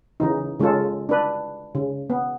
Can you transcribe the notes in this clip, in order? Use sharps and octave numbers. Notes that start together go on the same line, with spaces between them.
C#3 E3 D#4
C#3 G#3 C#4 F4 A4
D4 B4
C#3
B3